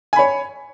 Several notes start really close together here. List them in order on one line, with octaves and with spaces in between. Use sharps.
G#5 B5 C#5